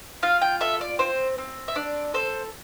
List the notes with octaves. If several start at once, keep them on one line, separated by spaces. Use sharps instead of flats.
F4 F5
G5
A4 E5
D5
C4 C5
C4
E5
D4 D5
A4 C5